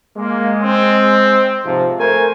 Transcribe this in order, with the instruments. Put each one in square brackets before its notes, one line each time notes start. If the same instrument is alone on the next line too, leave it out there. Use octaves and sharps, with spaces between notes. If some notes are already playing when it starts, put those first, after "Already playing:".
[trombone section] G#3 [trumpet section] A#3
[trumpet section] C4
[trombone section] G#2 C3 F3
[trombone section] A3 A#4 [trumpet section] C5 G#5